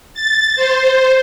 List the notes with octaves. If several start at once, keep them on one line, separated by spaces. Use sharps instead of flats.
A6
C5